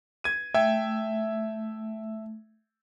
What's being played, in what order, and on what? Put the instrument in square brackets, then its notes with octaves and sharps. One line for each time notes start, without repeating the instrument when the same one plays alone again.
[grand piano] G#6 D#7
[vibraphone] A3 [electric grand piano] E5 [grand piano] G5 G#6